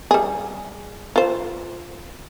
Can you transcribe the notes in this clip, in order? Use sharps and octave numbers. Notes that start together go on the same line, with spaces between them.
G3 G#4
F4 C5